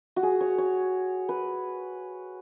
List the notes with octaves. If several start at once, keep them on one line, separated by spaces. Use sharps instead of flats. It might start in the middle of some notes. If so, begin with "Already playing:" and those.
F#4
G#4
C#5
C#5
B4